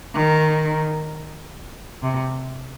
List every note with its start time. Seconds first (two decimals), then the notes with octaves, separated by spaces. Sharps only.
0.15 D#3
2.03 C3